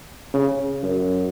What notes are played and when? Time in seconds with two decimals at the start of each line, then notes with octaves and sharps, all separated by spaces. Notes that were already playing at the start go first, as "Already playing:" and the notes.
0.34 C#3
0.82 F#2